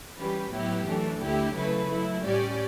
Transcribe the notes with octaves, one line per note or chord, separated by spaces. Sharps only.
E3 G3 C#4 G4 B4
A2 F#3 B3 E4 G4
F#2 E3 A3 D4
D2 D3 A3 E4 G4
C#3 F#3 A3 E4 B4
F#3 A3 E4
A2 G3 C#4 G4 D5